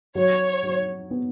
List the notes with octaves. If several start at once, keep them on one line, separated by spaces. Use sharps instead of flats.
F#3 C#5
F#3
B3